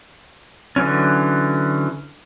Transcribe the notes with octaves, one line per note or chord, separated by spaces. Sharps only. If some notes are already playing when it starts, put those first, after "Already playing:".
D3 E3 F#3 C#4